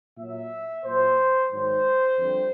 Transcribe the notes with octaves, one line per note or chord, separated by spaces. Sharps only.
A#2 F#3 E5
A#2 F#3 C5
G#2 D#3 F#3 C5
F2 D3 G3